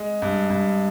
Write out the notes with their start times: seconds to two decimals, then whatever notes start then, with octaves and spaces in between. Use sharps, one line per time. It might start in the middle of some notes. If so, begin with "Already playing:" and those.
Already playing: G#3
0.22 G2
0.50 G2